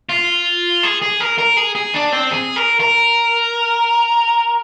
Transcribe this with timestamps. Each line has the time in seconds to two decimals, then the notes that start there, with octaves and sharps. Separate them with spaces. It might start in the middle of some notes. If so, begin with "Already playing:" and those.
0.09 F4
0.83 G#4
1.02 G#4
1.20 A#4
1.38 A#4
1.57 G#4
1.75 G#4
1.94 D4
2.12 C4
2.32 G#4
2.56 A#4
2.80 A#4